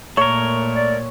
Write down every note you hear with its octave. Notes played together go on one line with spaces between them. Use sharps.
A#2 A3 A#4 C#5
D5